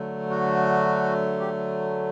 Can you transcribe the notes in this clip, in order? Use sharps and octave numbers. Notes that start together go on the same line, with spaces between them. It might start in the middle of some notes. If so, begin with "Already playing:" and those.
Already playing: D3 F#3 A3
F#4
G4